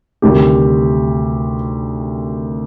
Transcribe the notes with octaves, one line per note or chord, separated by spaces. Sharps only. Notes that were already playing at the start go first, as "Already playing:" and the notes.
D2 C3 D#3 G3 G4